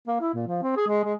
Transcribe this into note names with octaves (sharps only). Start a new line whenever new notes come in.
A#3
E4
A#2
F3
C4
G#4
G#3
G#3